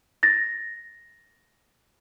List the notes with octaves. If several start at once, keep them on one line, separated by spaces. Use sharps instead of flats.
A6 A#6